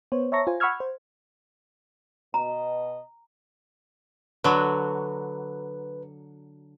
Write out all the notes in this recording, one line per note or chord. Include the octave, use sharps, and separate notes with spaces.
B3 C5 C#5
C#5 E5 A5 A#5 C#6 A#6
F4 C5 G#5
F#5 B5 C#6 E6 F6 G#6
C5
B2 D#5 A#5
D3 F#3 B4